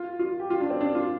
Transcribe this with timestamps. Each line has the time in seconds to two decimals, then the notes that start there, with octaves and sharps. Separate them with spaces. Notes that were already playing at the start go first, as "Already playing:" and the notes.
Already playing: F4
0.19 F4
0.40 G4
0.50 F4
0.60 D4
0.70 C4
0.81 D4
0.95 F4